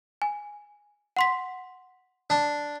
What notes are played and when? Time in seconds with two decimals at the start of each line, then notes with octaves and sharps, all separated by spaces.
0.22 G#5
1.17 F#5 C6 B6
2.30 D4